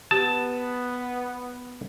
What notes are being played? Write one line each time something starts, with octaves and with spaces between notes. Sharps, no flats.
B3 G4 A5